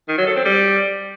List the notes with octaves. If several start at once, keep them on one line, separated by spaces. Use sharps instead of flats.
D#3
F#3
A4
C4
G3